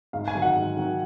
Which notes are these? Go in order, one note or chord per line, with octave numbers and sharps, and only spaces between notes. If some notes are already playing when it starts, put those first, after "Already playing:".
G#2 F5
G#5
D#3 F#3
F#5
G#2
D#3 F#3